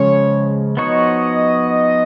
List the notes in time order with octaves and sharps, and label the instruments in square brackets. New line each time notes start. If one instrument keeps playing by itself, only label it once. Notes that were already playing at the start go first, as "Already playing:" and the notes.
Already playing: [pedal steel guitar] C#3 F3 G#3 C#4 G#4 [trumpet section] C#5
[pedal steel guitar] F3 B3 D#4 F#4 C#5 [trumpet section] D#5